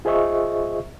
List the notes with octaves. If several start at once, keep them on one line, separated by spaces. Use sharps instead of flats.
F4 G#4 C5 D#5 E5 C#6